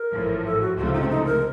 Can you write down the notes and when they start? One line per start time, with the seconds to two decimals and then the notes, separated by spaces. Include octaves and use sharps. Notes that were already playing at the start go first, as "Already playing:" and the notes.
Already playing: A#4
0.12 A1 A2 F3
0.45 A4
0.61 F#4
0.77 C#2 C3 F3 A3 F#4
0.85 F4
0.93 D#4
1.01 C4
1.09 D#4
1.25 A#4